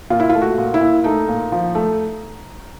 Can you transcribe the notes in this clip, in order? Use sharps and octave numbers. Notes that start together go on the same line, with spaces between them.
A#2 F4
E4
F4
A3
F#4
A#2
E4
A#2
A3 D#4
A#2
F3
A3